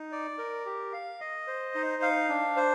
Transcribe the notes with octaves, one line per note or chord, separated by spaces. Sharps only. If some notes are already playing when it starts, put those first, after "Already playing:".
Already playing: D#4
D5
A#4
G4
F5
D#5
C5
D#4
F5
D4
C5